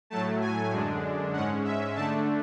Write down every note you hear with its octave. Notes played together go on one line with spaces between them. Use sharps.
A2 F#3 A3 A5
G#5
F#2 D3 G#3 D4
G#2 G#3 C#4 F#5
E5
D3 A3 D4 A5